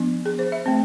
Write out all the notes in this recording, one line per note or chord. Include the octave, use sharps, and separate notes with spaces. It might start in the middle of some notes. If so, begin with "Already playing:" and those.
Already playing: F3 B3 D4
G#4
C5
E5
A3 C4